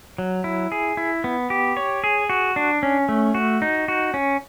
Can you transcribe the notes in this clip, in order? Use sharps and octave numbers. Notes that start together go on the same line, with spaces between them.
F#3
E4
G#4
E4
B3
G4
C#5
G#4
F#4
D4
C#4
A3
F#4
D#4
F#4
C#4